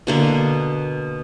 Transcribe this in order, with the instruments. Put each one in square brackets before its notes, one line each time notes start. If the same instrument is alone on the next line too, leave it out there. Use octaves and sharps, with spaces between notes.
[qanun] B2 D3 A#3